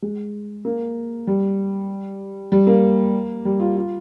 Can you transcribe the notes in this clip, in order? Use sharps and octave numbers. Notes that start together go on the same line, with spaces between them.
G#3
A#3
G3
G3
A#3
G3
F4
F4